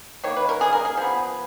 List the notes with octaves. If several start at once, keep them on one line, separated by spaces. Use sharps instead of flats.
D#3 A#3 C#5
B4
A#4
G#4
A#4
G#4
F3 B3